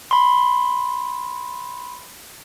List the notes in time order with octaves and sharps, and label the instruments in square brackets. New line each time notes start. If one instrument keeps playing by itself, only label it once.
[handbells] B5 C6